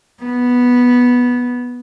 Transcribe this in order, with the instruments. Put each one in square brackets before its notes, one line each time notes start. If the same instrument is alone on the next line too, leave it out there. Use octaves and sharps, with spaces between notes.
[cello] B3